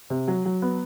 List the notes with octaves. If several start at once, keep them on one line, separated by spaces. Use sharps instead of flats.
C3
F#3
F#3
B3